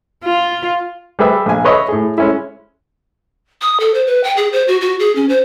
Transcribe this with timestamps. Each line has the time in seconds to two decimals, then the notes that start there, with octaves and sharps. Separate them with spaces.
0.24 F4
1.19 G3 G#4 B4 E5 E6
1.46 A#1 G#5
1.65 B4 C#5 D#5 E5 C#6
1.88 A2 G#4
2.18 G#3 C#4 E4
3.62 D#6
3.80 A4
3.94 C5
4.07 B4
4.24 G5
4.37 G#4
4.52 C5
4.68 F#4
4.81 F#4
4.99 G#4
5.15 C#4
5.29 C5